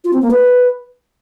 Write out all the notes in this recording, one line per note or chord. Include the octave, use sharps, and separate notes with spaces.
F4
C4
A#3
B4